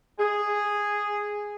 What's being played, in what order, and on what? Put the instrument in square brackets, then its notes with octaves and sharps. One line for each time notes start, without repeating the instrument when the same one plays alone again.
[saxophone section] G#4